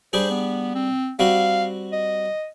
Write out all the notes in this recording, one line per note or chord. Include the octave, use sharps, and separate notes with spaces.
G3 D4 G#4 C5
B3
C4
G3 C4 F#4 F5
D#5